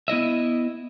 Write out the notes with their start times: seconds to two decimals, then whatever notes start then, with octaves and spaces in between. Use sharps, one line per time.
0.08 B3 E4 D#5 E5